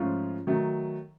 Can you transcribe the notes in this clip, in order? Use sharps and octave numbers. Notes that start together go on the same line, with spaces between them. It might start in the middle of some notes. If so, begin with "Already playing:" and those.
Already playing: G#2 F3 A3 C#4 F4
D#3 F#3 A3